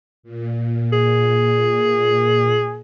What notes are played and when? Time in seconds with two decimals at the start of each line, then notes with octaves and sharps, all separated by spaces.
0.23 A#2
0.93 G#4